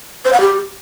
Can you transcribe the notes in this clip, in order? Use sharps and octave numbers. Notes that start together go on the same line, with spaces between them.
C5
F#5
G4